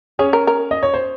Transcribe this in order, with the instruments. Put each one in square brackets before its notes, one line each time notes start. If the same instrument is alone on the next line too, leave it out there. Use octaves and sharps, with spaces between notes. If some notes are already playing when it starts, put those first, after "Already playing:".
[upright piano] C#4 C#5 [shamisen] G#4
[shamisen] A#4
A#4
[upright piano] D#5
C#5
C5